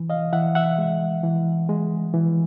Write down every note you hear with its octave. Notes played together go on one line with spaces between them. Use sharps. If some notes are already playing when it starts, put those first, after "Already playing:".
Already playing: E3
D#5 F5
E3 E5 F#5
E5 F#5
G#3
E3
G#3
E3